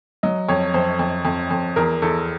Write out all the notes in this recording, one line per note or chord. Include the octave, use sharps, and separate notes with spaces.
F#3 D#5
F2 C#5
F2 C5
F2
F2
F2
E2 A#4
E2 A4